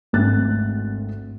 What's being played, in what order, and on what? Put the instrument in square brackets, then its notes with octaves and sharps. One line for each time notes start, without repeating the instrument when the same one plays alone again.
[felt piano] G#1 D2 C4 F#6 A6